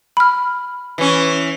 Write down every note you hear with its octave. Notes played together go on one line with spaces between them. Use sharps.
B5 F6
E3 C#4